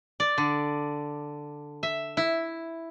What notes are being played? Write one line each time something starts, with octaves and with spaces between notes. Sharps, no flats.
D5
D3
E5
E4